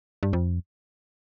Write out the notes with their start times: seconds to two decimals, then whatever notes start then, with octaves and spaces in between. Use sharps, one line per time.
0.23 G2
0.33 F2